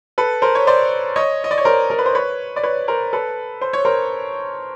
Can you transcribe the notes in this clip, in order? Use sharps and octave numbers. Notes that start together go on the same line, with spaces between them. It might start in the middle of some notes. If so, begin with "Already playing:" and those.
A4 B4
A#4 C5
C#5
C5 D5
C#5 D#5
D#5
D5
C#5
A#4 C5
A#4
B4
C5
B4 C#5
D5
B4 C#5
A#4 C5
A4 B4
C5
C#5
A#4 C5